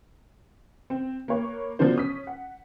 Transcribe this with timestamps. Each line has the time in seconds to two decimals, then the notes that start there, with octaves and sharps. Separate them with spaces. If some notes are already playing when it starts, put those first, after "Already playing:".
0.90 C4
1.28 A#3 A#4 B4 C#5
1.79 D3 F3 F#3 B3 D4 C5
1.96 C#4 D#6 B6
2.27 F#5